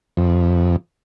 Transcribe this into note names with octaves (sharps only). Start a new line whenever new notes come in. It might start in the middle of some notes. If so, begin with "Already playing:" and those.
F2